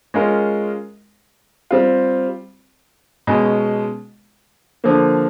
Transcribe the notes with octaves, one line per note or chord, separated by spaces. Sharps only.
G#3 C#4 F4 A#4
G3 C4 F4
B2 G#3 C#4
D3 F3 A#3